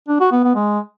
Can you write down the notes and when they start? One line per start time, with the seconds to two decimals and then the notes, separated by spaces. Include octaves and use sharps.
0.08 D4
0.20 F#4
0.32 B3
0.44 B3
0.55 G#3